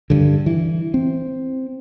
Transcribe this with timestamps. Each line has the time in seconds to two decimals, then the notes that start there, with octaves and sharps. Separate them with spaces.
0.10 G2 D3
0.46 E3
0.94 C4